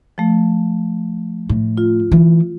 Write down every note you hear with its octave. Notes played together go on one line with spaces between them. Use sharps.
F3 A3
A2
F4
E3